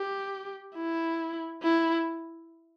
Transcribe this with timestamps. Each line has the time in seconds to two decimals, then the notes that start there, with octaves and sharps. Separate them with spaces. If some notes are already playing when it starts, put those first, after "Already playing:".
Already playing: G4
0.76 E4
1.62 E4